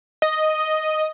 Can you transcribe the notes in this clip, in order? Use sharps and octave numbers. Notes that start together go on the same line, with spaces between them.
D#5